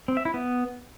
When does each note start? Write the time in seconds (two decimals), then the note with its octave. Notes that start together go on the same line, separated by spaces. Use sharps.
0.08 C4
0.17 E5
0.25 E4
0.34 B3